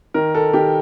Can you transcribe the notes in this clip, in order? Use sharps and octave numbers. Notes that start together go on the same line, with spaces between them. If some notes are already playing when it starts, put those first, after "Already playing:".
D#3 A#4
A4
D#3 G4